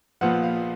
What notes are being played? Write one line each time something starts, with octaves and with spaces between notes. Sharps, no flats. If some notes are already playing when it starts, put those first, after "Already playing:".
A#1 A#2 F3 B3 F#5
F5